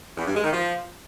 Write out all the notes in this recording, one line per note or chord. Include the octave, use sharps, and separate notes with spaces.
E2
G2
G#3
D#3
F3